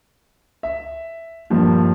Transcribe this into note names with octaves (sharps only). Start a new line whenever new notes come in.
E5
G2 A#2 D#3 F3 G3